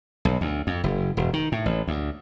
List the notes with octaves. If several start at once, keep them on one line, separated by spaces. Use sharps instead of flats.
B1
D2
F2
F#1
E1
D#3
A2
A1
D2